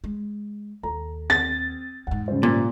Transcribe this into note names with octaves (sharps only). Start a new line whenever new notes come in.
G#3
D#2 A4 A#5
C4 A6
E2 G#2 F#5
C#3 G3 C5
A#2